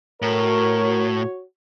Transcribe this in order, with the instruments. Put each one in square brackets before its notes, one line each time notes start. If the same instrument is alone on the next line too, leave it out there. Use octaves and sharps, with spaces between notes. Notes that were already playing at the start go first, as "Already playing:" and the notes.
[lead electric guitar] A2 [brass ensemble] F#4 C#5 [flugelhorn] A#4